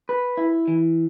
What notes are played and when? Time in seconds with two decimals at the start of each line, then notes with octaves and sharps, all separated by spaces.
0.09 B4
0.37 E4
0.68 E3